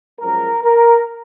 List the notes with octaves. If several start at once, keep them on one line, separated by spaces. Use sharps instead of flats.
F#2 F3 G#3 A#4
A#4